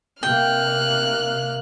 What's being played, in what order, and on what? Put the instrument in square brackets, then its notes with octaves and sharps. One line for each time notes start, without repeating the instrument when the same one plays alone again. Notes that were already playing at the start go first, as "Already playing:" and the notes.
[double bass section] C3 A#3 [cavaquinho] G5 [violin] F6 F#6